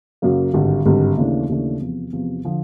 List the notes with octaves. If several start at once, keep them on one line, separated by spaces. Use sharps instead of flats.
F#2 C#3 F#3 A#3
G#1 G2 D3 G3
G#1 G2 D3 G3
D#2 C#3 E3 A3 D4
D#2 C#3 E3 A3 D4
E2 C3 F3
E2 C3 F3
D3 F3